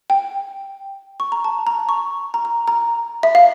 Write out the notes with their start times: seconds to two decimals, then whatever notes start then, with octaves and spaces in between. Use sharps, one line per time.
0.10 G5
1.20 C#6
1.32 A#5
1.44 A5
1.67 A#5
1.89 C#6
2.34 A#5
2.45 A#5
2.68 A#5
3.23 E5
3.35 F5